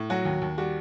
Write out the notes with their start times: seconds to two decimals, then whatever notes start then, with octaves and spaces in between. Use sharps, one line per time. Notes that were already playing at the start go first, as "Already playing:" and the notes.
Already playing: A2
0.10 F#3 F#4
0.25 D#2
0.42 D#2
0.58 G3 F#4